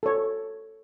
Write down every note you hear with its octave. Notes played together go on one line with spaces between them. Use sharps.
A4 C#5